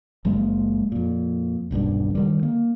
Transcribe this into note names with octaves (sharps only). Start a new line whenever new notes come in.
F#1 F#3 G#3 A#3
F2 A#2
D#1 B1 G2 D3
D3 D#3 G3
A#3